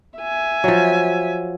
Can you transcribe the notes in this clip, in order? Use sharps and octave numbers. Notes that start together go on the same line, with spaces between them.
E5 G#5
F3 F#3